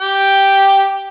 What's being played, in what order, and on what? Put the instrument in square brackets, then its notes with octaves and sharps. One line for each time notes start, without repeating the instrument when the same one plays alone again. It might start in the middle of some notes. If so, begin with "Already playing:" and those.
[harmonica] G4 G5